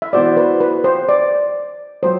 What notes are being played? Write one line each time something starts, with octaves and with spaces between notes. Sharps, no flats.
E5
E3 B3 F#4 C5 D5
B4
B4
C5
D5
F#3 C5